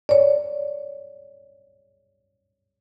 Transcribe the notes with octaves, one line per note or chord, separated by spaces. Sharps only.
C#5 D5